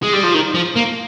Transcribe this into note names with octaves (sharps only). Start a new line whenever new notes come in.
G#3
G3
F3
D#3
F3
A#3